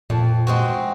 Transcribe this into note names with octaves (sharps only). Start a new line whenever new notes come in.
F2 A#2
G#3 C4 F#4